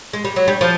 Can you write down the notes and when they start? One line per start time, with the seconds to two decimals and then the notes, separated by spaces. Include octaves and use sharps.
0.13 G#3
0.25 G3
0.36 F#3
0.48 G3
0.61 F3